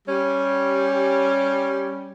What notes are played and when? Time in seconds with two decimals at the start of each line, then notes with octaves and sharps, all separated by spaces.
0.08 G3 C#4